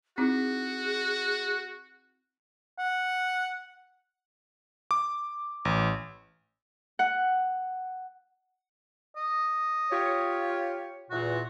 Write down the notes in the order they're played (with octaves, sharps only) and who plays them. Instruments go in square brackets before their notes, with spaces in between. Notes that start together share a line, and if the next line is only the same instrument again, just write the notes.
[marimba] C4 D#4 E4 [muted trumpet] F#4 [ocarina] G#4
[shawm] F#5
[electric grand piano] D6
A1
[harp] F#5
[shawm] D#5
[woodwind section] F4 G4 C#5
[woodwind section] E2 A#2 [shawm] F#4